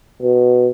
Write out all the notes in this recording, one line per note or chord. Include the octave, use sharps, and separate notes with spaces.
B2